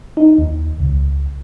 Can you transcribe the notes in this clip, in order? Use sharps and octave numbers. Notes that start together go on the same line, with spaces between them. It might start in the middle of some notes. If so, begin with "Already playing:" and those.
D#4
D#2
C#2